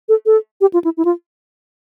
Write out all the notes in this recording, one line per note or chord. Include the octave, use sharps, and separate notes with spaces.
A4
A4
G4
F4
E4
E4
F4